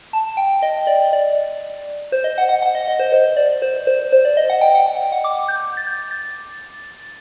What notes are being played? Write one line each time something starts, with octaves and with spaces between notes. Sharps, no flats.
A5
G5
D#5
D5
D5
C5
D#5
F#5
F#5
F#5
D#5
D#5
C5
C5
D5
C5
C5
C5
D5
D#5
F#5
G5
F#5
G5
F#5
D6
G6
A6
G6
A6